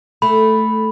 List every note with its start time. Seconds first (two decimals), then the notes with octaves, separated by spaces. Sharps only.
0.22 A3 B5